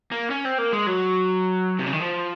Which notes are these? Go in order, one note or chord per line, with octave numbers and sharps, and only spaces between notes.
A#3
C#4
C4
A#3
G#3
F#3
C3
C#3
D#3
F3